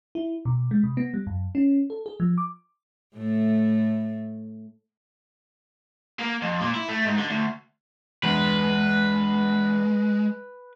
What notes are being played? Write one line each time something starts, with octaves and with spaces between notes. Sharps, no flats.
E4
B2
G#3
C3
B3
G3
F#2
C#4
A4
G#4
F3
D6
A2 A3
A#3
F2
A#2
E4
A3
G#2
D3
D2
E2 G2 G#3 B4